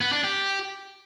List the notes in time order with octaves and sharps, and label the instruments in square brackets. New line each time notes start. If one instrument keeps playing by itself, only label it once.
[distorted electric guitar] B3
D4
G4